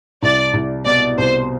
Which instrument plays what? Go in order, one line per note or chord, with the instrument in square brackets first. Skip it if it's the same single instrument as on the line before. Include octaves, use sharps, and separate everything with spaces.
[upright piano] C2 [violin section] D5
[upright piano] C2
[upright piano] B2 [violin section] D5
[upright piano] C2 [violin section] C5